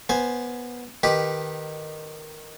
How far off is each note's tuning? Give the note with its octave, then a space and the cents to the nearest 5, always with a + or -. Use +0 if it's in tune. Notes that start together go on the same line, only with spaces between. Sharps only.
B3 -15 C5 +0 G#5 +0
D#3 -10 G4 +0 B4 -5